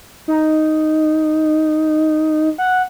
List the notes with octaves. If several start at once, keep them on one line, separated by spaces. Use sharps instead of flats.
D#4
F#5